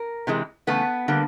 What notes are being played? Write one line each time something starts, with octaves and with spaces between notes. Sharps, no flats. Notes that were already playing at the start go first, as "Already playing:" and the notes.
Already playing: A#4
C3 E3 G#3
C#3 E3 A3 B3 B4
D3 G3 A#3